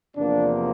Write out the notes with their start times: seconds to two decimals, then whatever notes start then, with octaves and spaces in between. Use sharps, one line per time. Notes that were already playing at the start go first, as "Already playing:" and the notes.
0.17 E2 C3 F3 A#3 D4